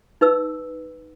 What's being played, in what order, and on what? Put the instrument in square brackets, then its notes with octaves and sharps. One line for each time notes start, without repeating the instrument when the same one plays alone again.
[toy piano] D#4 B4 E6